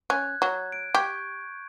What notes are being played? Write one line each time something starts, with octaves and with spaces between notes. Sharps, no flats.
C#4 F#6 G#6
F#3 G#6
D7
G4 C#6 G6 G#6